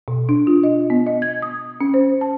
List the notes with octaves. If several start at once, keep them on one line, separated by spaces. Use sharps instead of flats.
B2
D4
F4
D#5
B3
D#5
G#6
D#6
C#4
C5
A5